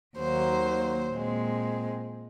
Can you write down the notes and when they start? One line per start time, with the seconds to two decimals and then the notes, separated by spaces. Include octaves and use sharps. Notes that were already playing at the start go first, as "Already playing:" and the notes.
0.18 D#2 D#3 F#3 A#3 C5
1.13 A#2 G#3 C4